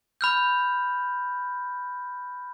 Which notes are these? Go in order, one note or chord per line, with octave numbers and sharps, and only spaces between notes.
B5 F6 G6